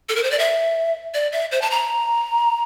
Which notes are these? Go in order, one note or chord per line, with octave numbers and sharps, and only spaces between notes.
A4
A#4
C5
D5
E5
D5
E5
C5
A5
A#5